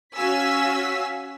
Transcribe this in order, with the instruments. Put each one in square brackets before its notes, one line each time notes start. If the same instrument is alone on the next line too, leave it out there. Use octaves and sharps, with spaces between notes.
[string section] C#4 F#4 F5 G#5 E6 B6